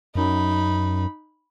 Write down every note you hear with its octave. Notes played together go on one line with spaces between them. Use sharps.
F#2 D#4 B5